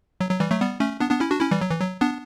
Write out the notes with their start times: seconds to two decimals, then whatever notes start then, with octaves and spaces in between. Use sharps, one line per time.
0.21 F#3
0.31 F#3
0.40 E3 G3
0.51 F#3 A3
0.60 G3 B3
0.80 A3 C#4
1.00 B3 D4
1.10 B3 D4
1.20 C#4 E4
1.31 D4 F#4
1.41 C#4 E4
1.51 E3 G3
1.61 F#3
1.71 E3
1.81 F#3
2.01 B3 D4